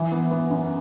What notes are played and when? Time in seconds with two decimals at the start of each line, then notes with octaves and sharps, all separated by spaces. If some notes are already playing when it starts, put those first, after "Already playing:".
Already playing: E3
0.11 B3
0.31 B3
0.50 F#2